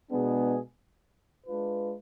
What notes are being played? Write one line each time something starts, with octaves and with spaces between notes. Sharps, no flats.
B2 G#3 B3 D4 G#4
G#3 D4 F4 B4